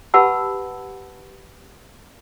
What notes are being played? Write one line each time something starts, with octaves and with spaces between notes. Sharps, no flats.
G4 B4 F#5 A5 B5 E6